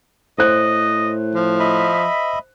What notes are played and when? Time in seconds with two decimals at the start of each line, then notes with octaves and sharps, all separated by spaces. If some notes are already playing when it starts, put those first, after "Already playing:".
0.38 A2 C5 D#5 F#6
1.35 F3
1.60 D#5 E5 B5